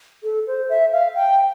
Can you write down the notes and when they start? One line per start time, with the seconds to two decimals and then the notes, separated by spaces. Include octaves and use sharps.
0.23 A4
0.47 C5
0.69 E5
0.92 F5
1.15 G5